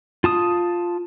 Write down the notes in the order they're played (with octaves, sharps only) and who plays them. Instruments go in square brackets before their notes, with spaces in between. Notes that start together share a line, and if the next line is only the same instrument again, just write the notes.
[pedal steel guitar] F4 A5 D#6